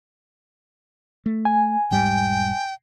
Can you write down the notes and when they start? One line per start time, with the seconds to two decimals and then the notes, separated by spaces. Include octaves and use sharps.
1.26 A3
1.45 G#5
1.91 E1 G#2 G3 G5